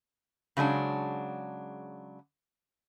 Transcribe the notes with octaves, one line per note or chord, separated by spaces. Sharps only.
C#3 F#3 G#3 D4 F#5